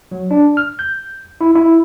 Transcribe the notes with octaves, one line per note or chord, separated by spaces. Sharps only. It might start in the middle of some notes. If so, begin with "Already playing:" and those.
F#3
D4
F6
G6
E4
E4